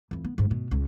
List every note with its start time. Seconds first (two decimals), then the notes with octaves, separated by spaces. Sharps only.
0.11 F2 E3
0.25 B3
0.38 G1 G#2
0.51 B2
0.71 C#2 C#4